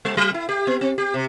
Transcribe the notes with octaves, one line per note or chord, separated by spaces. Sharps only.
G3
F#3
E4
G4
B3
C4
G4
C3